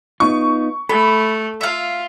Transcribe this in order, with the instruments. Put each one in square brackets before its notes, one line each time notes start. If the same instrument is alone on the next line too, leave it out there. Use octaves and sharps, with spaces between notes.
[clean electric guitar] B3 D#4 F4 [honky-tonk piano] C#6
[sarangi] A3 [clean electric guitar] A4 [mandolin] B5
[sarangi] F4 [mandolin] E5 F5